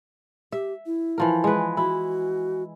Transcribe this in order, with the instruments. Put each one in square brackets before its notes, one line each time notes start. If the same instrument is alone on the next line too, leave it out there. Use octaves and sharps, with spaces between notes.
[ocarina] G4 [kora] E5
[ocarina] E4
[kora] E3 F3 A#4
G#3 B4
[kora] E4 [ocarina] F#4